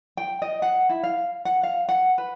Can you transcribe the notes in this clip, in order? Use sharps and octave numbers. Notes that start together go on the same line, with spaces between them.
G5
D#5
F#5
E4
F5
F#5
F5
F#5
B4